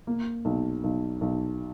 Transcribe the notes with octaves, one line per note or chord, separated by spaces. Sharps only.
A#3
B1
B1
B1